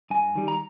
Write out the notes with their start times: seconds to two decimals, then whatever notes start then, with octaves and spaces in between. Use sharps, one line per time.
0.10 G2 G#5
0.35 D#3 G3
0.48 A#5